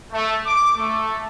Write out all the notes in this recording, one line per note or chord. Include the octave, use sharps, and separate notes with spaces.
A3
D6
A3